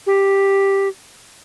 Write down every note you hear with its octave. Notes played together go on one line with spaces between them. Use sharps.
G4